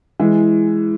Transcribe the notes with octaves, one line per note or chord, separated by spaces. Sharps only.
E3 G#3